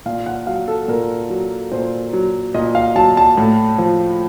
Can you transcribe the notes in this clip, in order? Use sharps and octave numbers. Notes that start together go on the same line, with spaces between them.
A#2 F5
F#5
F#3 F5
A4
A#2 A#4
F#3
A#2 C5
F#3
A#2 D#5
F5
F#3 A5
A5
A2
F3